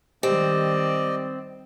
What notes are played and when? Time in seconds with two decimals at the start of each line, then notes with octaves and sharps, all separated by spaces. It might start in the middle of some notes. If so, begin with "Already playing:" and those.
0.23 D#3 G3 C4 G4 D5 D#5